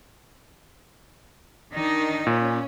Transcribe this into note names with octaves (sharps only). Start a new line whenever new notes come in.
D#3 D4 D#4
A#2 C#4